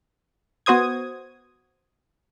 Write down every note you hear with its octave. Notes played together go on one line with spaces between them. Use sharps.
B3 F#4 C5 D#6 G#6